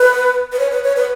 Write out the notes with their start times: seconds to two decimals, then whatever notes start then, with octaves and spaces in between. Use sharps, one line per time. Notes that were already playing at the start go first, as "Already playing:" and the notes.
Already playing: B4
0.52 B4
0.59 C#5
0.71 B4
0.84 C#5
0.96 B4